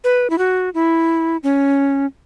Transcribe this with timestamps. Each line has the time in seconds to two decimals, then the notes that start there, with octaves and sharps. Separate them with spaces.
0.04 B4
0.30 E4
0.38 F#4
0.74 E4
1.43 C#4